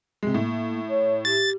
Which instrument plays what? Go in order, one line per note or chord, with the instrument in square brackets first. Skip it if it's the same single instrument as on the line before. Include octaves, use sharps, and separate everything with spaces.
[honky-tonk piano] C3 G#3
[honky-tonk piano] A2 [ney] A#3
[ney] C#5
[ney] G4 [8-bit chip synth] A6